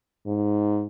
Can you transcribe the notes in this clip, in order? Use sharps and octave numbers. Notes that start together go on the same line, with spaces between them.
G#2